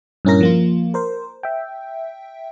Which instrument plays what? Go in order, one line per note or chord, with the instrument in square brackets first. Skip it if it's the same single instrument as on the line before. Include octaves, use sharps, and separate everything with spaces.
[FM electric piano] G2 A#2 C#4 E4 A#4 A#6
F3 A#3 F4
A#4 C5
E5 G5